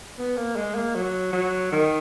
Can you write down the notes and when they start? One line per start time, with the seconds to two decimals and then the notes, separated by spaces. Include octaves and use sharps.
0.19 B3
0.37 A#3
0.56 G#3
0.75 A#3
0.96 F#3
1.33 F#3
1.72 D#3